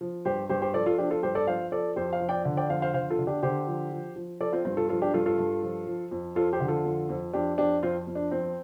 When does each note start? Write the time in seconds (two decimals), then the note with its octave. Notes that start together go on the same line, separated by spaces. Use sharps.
0.01 F3
0.25 G2 G4 C5
0.50 G2 G4 C5
0.62 G4 C5
0.74 F3 A4 D5
0.86 F4 A4
0.98 F3 D4 G4
1.11 F4 A4
1.23 G2 G4 C5
1.35 A4 D5
1.47 F3 C5 F5
1.72 F3 A4 D5
1.96 F2 G4 C5
2.12 C5 F5
2.20 F3
2.29 D5 G5
2.45 D3
2.57 D5 G5
2.69 F2 C5 F5
2.82 C5 F5
2.94 D3 C5 F5
3.10 F4 A4
3.19 D3
3.27 D4 G4
3.43 D3 G4 C5
3.67 F3
3.92 F3
4.16 F3
4.40 F3 A4 D5
4.53 C4 F4
4.65 G2 C4 F4
4.77 F4 A4
4.89 F3 F4 A4
5.02 D4 G4
5.14 G2 F4 A4
5.26 F4 A4
5.39 G2
5.63 F3
5.87 F3
6.11 F2
6.35 F2 F4 A4
6.53 G4 C5
6.60 D3
6.68 F4 A4
6.85 F2
7.09 F2
7.33 F2 D4 G4
7.58 F2 D4 G4
7.83 F2 C4 F4
8.07 F2
8.15 D4
8.31 F2 C4